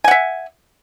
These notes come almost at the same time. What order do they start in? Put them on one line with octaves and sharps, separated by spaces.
G#5 F#5 E5